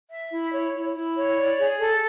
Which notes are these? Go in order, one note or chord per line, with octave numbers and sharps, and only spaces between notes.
E5
E4
C#5
E4
E4
C#5
D5
G#4
A4